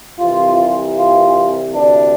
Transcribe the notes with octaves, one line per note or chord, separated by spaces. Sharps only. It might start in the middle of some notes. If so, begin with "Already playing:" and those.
C2 C3 E3 F4
F4
D2 C3 E3 D4